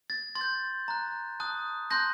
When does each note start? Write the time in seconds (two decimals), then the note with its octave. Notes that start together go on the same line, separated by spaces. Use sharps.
0.10 A6
0.35 C6 A6
0.41 G6
0.88 A#5 F#6
1.40 A5 D#6 F#6
1.91 A5 C6 F#6 G6 A#6